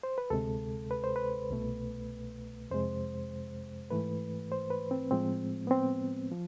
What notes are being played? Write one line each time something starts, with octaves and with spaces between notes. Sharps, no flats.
C5
B4
D2 C3 G#3 A4
B4
C5
B4
C2 B2 A3
F2 C3 G#3 C5
G#2 E3 A3 B4
C5
B4
C4
A2 F3 G#3 C4
B3
C4
F3